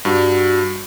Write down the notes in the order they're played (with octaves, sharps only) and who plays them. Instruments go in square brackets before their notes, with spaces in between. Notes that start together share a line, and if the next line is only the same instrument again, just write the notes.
[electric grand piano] G2 [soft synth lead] F#4